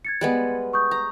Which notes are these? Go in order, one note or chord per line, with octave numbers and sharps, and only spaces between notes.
G#6 A6 C#7
G3 G#3 B3
C#6 D#6 G6
A#5